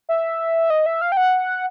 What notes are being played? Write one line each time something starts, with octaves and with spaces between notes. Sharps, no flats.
E5
D#5
E5
F5
G5
F#5